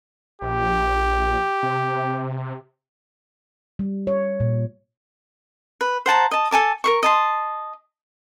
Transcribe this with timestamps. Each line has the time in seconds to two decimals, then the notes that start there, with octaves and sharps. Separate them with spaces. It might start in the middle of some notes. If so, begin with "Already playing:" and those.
0.42 A#1 G4
1.63 C3
3.79 G3
4.07 C#5
4.40 A#2
5.81 B4
6.06 C5 F#5 A5 A#5
6.31 D#5 A5
6.51 A4 G#5 A5 D6
6.84 A#4 C5 C#6
7.03 D#5 A5 C6